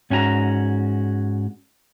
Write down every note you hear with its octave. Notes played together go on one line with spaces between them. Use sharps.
G#2 C#4 F#4 G#5 A#5